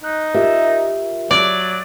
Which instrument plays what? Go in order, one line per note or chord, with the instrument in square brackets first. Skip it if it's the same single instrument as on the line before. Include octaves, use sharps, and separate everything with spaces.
[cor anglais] D#4 [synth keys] F#6
[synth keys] F4 G4 A#4 [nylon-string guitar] E5
[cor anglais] F#3 [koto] D5